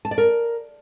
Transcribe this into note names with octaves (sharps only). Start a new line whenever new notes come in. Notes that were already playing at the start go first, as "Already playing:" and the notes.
A5
D5
A#4